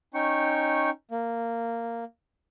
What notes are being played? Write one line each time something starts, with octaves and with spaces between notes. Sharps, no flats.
C#4 D#4 G5 C#6
A#3